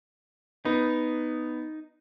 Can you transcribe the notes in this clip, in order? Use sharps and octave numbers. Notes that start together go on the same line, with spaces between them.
B3 D#4